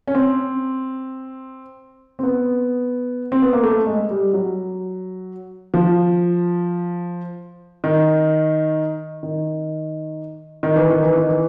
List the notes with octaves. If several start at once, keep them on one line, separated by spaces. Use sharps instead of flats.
C#4
C4
C4
B3
C4
B3
A#3
A3
G#3
G3
F#3
F3
D#3
D#3
D#3
E3
D#3
E3
D#3
E3